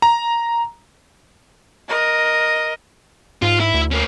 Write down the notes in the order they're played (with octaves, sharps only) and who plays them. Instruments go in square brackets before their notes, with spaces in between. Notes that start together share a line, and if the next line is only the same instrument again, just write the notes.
[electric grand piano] A#5
[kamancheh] A#4 D#5
[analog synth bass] G#2 [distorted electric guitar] F4
[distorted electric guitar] E4
[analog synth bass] D2
[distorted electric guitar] A#3 C#4